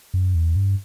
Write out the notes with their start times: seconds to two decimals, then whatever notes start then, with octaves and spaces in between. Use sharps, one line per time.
0.14 F#2
0.35 E2
0.56 G2